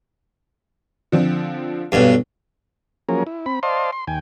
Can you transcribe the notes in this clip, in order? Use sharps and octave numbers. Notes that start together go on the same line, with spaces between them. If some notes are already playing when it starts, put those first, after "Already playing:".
D3 F3 C4
B1 G2
F3 F#3 A#3 C#4 G#4 A#4
E4
C4 B5
C5 D5 D#5 F5 A5 C6
C6
D#2 G5 G#5